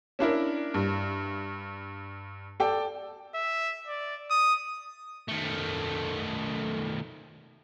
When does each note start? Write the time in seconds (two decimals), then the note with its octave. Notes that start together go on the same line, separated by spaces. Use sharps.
0.19 C#4 D4 E4 A#4
0.74 G2
2.60 A4 D5 G5
3.35 E5
3.88 D5
4.30 D#6
5.28 D#3 A3